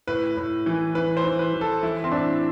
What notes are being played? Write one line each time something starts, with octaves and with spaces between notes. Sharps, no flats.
A2 B4
A2
E3
E3 B4
C5
E3
B4
E3
A4
E3 E4
C4
A2 D4